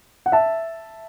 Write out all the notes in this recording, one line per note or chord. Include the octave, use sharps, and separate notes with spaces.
F#5
E5 A5